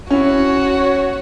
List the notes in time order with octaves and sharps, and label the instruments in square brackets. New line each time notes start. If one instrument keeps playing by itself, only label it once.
[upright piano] C#4 E4 [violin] F#4 C#5